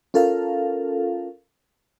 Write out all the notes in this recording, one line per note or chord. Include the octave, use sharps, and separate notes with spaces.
C#4 F4 A4 A#4 F5